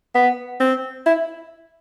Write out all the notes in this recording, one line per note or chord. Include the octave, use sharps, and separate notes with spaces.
B3
C4
E4